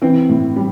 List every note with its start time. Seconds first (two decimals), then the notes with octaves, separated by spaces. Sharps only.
0.02 E3 C4
0.29 A2
0.56 G3